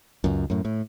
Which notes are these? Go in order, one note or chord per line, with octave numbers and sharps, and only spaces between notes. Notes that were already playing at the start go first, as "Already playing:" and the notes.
C#2 F#2
F#2 A2
A2